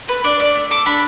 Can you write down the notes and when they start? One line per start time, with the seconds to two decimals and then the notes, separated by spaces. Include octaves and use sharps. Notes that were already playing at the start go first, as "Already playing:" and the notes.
0.08 A3 B4
0.24 D4 D5
0.40 A3 D5
0.55 A3
0.71 A4 D6
0.86 D4 B5